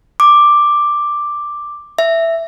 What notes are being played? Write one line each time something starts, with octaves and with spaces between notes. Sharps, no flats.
D6
E5